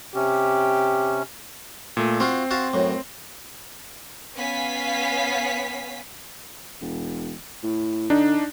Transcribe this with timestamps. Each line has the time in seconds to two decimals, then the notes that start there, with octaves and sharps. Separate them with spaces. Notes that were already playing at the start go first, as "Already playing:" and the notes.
0.15 C3 C#4 G4
1.97 A#2 A3
2.20 C4 F4 F#4 F5 C6
2.51 F#4 F5 A5
2.74 F#2 A2
4.36 B3 C#4 F5 G#5 B6
6.81 E1
7.63 A2
8.10 D3 D4 D#4